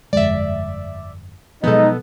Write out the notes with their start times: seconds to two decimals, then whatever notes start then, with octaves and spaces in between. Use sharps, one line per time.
0.13 G1 F2 G#3 D5 E5
1.64 B2 F3 F#3 G#3 B3 D#4 A4 D#5